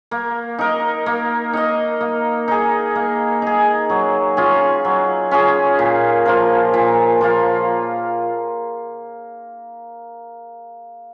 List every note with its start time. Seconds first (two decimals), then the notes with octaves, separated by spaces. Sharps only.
0.11 A#3
0.59 D#4 A#4 D#5
1.06 A#3
1.53 D#4 A#4 D#5
2.00 A#3
2.48 D#4 G#4
2.95 A#3
3.42 D#4 G#4
3.90 F#3
4.37 C#4 F4 G#4
4.85 F#3
5.31 C#4 F4 G#4
5.79 A#2
6.26 F3 A#3 F4
6.74 A#2
7.21 F3 A#3 F4